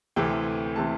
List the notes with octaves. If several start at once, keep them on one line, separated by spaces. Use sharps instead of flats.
D2 C3 E3 A3 C4 G5
C3 E3 A3 C4 A5